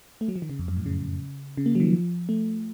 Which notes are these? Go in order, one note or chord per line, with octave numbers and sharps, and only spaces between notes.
A3
F#3
F3
D#3
C#3
F2
F#2
A2
C#3
C#3
A#3
F#3
D#3
F3
A3